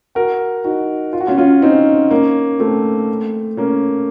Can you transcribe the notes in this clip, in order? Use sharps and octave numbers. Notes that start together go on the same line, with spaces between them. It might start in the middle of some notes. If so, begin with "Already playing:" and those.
F#4 A#4
D#4 F#4
F4
F#4
C#4 F4
C#4 F4
C4 D#4
A#3 C#4
A3 C4
A#3 C#4